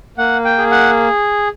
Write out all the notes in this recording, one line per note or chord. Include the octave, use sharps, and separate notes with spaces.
A#3 F#5
G5
G#4
F#5